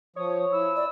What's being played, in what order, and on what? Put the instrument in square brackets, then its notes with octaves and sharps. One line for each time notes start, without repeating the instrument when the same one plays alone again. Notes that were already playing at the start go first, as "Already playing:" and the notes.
[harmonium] F3 [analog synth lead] C#5 [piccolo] D#6
[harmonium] E4 [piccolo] E6
[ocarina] D5